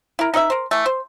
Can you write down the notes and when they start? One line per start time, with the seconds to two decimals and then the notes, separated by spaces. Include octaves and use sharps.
0.19 E4 A#4
0.34 D#4 B4 D#5 E5
0.50 A#4 C5
0.71 E3 A3
0.86 C5